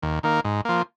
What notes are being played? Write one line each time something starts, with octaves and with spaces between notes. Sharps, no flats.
D#2
D#3 A#3
G#2
F3 A#3